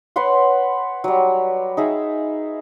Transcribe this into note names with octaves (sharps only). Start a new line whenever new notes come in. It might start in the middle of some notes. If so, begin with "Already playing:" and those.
B4 C#5 F#5 C6
F#3 G3
D#4 G#4 E5